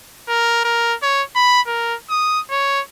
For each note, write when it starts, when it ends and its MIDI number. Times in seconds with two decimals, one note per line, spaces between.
0.29 0.62 70
0.65 0.95 70
1.03 1.23 73
1.36 1.61 83
1.67 1.96 70
2.10 2.40 87
2.51 2.82 73